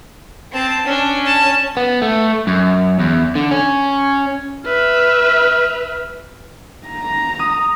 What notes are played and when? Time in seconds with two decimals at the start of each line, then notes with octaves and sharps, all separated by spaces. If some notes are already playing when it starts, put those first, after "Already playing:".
0.51 C4 A5
0.86 C#4 D4
1.25 A5
1.77 B3
2.02 A3
2.47 F#2
2.99 E2
3.35 D3
3.51 C#4
4.65 B4 E5 F6
6.87 A#5
7.39 D#6